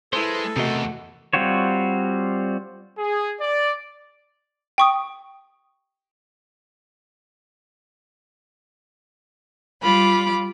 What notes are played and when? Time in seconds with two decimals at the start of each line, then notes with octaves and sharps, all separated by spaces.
0.13 G#3 E4 A4 B4 C5
0.56 E2 C3 A3 F#4 A#4 D#5
1.33 G3 C4 F4 F#4 C#5
2.99 G#4
3.40 D5
4.78 G5 C#6 D#6
9.82 G3 F4 B5 D6